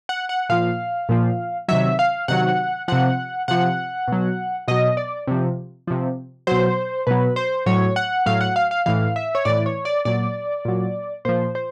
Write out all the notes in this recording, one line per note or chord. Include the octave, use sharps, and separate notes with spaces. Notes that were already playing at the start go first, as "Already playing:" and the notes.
F#5
F#5
A#2 F3 F5
A#2 F3
C3 D#3 F#3 E5
F5
C3 D#3 F#3 F#5
C3 F3 F#5
C3 F3 F#5
B2 F#3
B2 F#3 D#5
D5
C3 F3
C3 F3
B2 F#3 C5
B2 F#3 B4
C5
A2 F#3 C#5
F#5
A2 F#3 F5
F#5
F5
F5
A2 E3 F5
E5
C#5
A2 E3 D5
C#5
D5
A#2 F#3 D5
A#2 F#3
A#2 F3 C5
C5